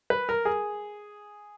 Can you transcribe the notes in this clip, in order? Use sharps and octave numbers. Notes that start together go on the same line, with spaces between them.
B4
A#4
G#4